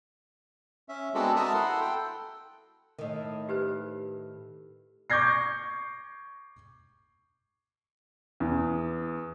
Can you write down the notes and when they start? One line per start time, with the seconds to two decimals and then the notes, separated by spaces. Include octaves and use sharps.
0.89 C#4 E5
1.14 G#3 B3 C4 D4 F#4 A4
1.36 F#4 A#4 E5 A5 A#5 D#6
1.54 E4 A4 F#5 C6
1.81 A4 G5
2.99 A2 D#3
3.49 G4 B4 C5
5.10 C#6 D6 G6 G#6 A#6 C7
8.40 E2